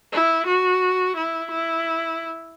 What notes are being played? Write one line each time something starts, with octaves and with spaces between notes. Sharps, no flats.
E4
F#4
E4
E4